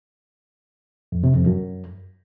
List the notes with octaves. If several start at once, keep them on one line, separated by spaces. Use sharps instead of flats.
F2
C3
F2
F#2